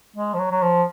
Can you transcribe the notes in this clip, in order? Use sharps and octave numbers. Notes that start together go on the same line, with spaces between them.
G#3
F3
F#3
F#3
F3